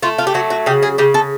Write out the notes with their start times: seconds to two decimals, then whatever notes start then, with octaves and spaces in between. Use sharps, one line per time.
0.02 A3 F4
0.18 F4
0.27 G4
0.34 F#3 F#4
0.50 F#4
0.66 C#3 G4
0.83 G#4
0.98 C#3 G4
1.14 A4